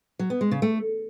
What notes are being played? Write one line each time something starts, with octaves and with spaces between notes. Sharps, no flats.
F#3
B3
G#3
C#3
A3